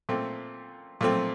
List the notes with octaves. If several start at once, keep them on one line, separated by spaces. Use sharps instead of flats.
A#2 A3 C4
A#2 A3 C4